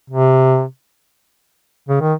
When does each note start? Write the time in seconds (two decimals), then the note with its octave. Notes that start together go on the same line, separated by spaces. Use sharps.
0.10 C3
1.89 C#3
2.01 D#3